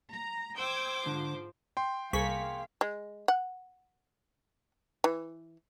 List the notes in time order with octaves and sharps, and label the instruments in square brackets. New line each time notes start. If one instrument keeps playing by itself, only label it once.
[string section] A#5
[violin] C5 D6 [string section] G5 E6 G#6
[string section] G#2 F3 [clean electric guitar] D3
[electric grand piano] G5 C6
[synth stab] C2 C#6 B6 [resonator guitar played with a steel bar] A#3 G#4 [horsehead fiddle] F5
[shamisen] G#3
F#5
E3